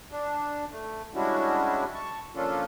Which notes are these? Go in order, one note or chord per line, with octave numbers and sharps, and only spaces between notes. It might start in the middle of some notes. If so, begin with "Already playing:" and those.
D4
A3
G3 G#3 C#4 D4 E4 F#4
A5 C#6
F3 A#3 C#4 D4 F4 A4